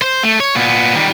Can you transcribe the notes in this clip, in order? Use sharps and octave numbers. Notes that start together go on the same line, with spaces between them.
C5
A3
C#5
A#2 B3
D#3 G3